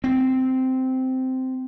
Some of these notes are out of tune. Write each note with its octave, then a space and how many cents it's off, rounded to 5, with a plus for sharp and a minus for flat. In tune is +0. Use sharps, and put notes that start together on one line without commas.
C4 -10